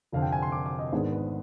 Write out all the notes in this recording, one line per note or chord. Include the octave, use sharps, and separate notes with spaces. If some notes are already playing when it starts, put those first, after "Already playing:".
F1 F2 D3 F5
G5
G#5
C6
D6
D6
D#5
G#1 G#2 D#3 B3 D4 G#4
B4